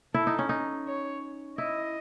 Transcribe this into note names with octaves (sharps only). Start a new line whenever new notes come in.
E4 A4
D#4
C#4
D#4
C#5
E4 D#5